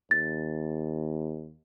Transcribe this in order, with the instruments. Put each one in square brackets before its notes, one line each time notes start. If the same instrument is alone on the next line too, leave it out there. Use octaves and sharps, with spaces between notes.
[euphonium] D#2 [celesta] A6